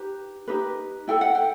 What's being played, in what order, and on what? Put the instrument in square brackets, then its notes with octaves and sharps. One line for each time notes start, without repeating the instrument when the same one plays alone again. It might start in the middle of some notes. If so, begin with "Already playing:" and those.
Already playing: [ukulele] D#4 G4 B4
D#4 G4 B4
E4 A4 G5
F#5
G5